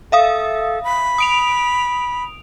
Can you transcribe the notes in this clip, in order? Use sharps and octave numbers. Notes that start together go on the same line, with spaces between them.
A4 E5 F5 D#6
B5
D#6 D7 F7